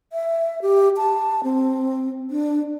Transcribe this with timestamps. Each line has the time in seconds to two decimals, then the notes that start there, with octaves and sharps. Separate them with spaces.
0.13 E5
0.62 G4
0.97 A5
1.44 C4
2.31 D4